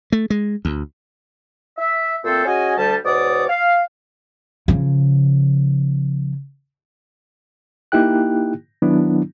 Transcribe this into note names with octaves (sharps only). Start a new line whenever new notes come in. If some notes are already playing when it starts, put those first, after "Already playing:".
A3
G#3
D2
E5
A#2 A3 C4 A4 C5 E6
C#4 F#4 G#4 D#5 G#5
D2 G3 A5
G#2 B2 C#5 D5 D6 D#6
F5
C#3 F3
A#3 D#4 E4 G4 G5 F#6
D#3 F#3 B3 D4 E4